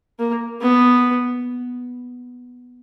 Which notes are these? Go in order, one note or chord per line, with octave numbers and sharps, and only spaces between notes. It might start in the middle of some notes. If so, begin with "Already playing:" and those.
A#3
B3